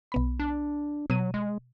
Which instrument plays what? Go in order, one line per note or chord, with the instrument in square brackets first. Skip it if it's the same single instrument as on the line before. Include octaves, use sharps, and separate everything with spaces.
[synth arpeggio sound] B1 B3 B5
[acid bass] D4
[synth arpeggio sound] B2 D#7 [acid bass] F#3
[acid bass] G#3